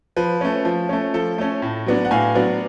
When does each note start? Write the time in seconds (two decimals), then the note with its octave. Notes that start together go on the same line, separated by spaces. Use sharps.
0.16 F3 B4
0.41 A3 C#4
0.65 F3
0.89 A3 C#4
1.14 F3 A4
1.38 A3 C#4
1.62 A2
1.86 F#3 B3 D4
2.05 F#5
2.11 A2 F5 G#5
2.35 F#3 B3 D4